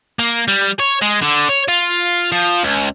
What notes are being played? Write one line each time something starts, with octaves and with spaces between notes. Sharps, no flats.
A#3
G3
C#5
G#3
D3
C#5
F4
F3
C#2